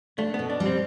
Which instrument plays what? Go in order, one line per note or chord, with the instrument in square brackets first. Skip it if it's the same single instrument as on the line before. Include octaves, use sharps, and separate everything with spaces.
[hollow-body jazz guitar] A3 [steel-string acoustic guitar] D4
[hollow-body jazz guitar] B3
[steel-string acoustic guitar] B2
[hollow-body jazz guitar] D4
[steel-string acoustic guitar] G3
[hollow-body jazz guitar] C4